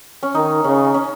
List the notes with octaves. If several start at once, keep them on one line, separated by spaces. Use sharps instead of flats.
C#4
D#3 D#4
C#3 C#4
C#4